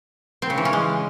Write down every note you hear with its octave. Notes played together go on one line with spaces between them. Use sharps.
C4
C#3
E3
C#4
G#3